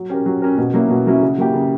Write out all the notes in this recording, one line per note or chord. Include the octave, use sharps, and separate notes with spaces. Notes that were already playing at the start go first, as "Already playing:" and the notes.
Already playing: F#3
C#4 G4 A#4
F#3
C#4 G4 A#4
B2
F#3 A#3 C#4 E4
B2
F#3 A#3 C#4 E4
C#3
F#3 A#3 E4 G4
C#3